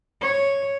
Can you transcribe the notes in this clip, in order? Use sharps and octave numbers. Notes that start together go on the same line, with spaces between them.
C#5